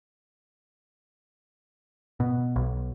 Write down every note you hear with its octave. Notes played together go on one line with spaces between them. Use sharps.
B2
B1